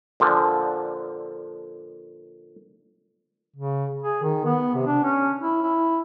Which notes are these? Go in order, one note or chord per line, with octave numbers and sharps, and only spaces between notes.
A#2 D3 F3
C#3
G#4
D#3
B3
C3
D4
C#4
E4
E4